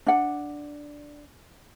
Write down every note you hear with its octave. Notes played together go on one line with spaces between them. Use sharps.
D4 F#5